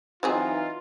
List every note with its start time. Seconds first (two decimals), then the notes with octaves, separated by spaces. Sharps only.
0.23 E3 F#3 C4 D#4 F4 G#4